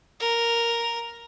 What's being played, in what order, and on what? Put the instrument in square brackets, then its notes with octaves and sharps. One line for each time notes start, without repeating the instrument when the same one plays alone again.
[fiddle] A#4